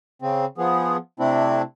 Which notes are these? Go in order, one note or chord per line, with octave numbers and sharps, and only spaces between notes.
C#3 C4
F3 B3 G#4
C3 A3 C4 D4 E4